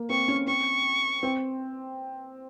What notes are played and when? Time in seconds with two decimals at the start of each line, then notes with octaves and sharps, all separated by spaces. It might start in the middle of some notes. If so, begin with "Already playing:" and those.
Already playing: A#3
0.09 C4 C#6
0.28 C#4
0.47 C4 C#6
1.23 C4